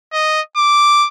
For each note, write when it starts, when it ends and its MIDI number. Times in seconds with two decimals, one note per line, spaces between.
0.13 0.41 75
0.57 1.08 86